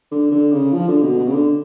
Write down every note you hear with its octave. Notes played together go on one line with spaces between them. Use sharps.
D3
D3
C#3
F3
D3
B2
B2
C#3
D3